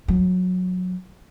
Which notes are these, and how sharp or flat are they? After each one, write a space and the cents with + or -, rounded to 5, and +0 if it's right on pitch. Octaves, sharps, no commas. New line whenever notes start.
F#3 -20